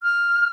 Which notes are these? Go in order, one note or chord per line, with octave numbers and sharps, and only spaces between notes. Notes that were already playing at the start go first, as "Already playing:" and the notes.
F6